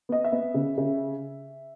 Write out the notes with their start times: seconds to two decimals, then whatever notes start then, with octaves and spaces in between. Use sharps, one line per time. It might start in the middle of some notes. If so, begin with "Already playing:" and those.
0.09 B3 D#5
0.25 E5
0.32 B3
0.54 C#3
0.78 C#3